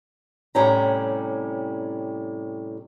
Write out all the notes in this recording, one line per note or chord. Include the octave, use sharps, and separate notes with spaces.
A2 C3 G3 C#4 G5 A#5